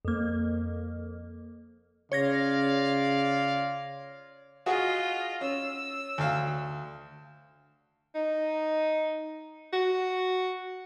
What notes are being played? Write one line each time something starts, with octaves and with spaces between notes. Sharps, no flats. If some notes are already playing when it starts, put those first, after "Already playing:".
F2 A#3
C#3 F4 C#5 D5 F5 G#6 A#6
F4 F#4 G#4 D#5
C#4 E6
D2 F5
D#4
F#4